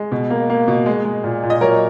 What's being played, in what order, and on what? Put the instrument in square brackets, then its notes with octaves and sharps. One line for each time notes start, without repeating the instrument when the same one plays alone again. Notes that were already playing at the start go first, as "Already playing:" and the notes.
Already playing: [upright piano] G#3
B2
A#3
A#3
B2
G#3
G#3
A#2
A#2
D#5
F#3 A#4 C#5